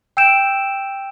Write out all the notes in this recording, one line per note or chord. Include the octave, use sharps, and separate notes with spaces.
G5 E6 G6 D7 E7